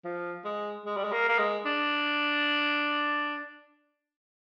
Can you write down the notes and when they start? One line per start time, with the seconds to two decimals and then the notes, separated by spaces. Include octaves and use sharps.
0.05 F3
0.45 G#3
0.85 G#3
0.97 G3
1.04 G#3
1.12 A#3
1.29 A#3
1.39 G#3
1.65 D4